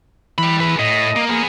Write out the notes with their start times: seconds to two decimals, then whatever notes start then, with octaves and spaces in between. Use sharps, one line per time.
0.38 E3 G5 B5
0.60 G#4 B4
0.79 A2 D#5
1.16 A#3
1.29 A#3 B3 G#4